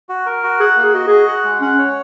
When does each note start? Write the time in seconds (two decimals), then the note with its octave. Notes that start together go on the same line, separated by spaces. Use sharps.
0.09 F#4
0.26 A#4
0.43 F#4
0.60 G#4 F#5
0.77 A#3
0.82 G#4
0.94 F#4 D#5
1.07 F#4 G#4
1.28 F#5
1.44 G#3
1.61 C#4 F#5
1.79 C#5